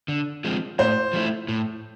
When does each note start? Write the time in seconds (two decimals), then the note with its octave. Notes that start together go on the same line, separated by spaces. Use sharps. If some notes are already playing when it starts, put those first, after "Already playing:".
0.08 D3
0.44 F3 G#3 C4
0.79 A2 C5
1.13 F3 A3 E4
1.49 A2